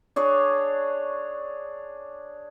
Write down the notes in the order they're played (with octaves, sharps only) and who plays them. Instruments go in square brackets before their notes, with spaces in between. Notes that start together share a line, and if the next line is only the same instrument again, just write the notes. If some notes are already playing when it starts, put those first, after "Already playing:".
[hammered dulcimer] D4 G#4 C#5